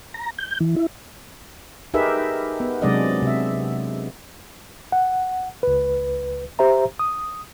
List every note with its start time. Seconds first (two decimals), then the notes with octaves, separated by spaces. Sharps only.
0.14 A#5
0.38 G6
0.60 E3
0.76 E4
1.94 D#4 G4 G#4 A#4 B4 E5
2.60 B3
2.82 C3 F#3 G#3 D4 D5 D#5
3.22 C3 E5
4.92 F#5
5.63 C#2 B4
6.59 G4 C5 E5 A#5
6.99 D#6